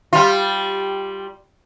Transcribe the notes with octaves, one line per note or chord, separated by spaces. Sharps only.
G3 F4